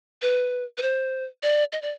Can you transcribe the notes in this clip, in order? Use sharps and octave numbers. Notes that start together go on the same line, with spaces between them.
B4
B4
C5
D5
D#5
D5